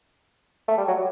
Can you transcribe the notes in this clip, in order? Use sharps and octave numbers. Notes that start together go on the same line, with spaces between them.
A3
G3
F#3